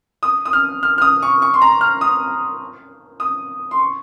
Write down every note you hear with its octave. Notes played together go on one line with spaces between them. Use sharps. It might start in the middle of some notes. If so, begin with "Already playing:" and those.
D#6
D#6
F6
F6
F6
D#6
C#6
C#6
C6
A#5
F6
D#6
D#6
C6
C#6